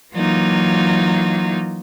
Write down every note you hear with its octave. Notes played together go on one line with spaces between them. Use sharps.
E3 F#3 A#3 D#4 F4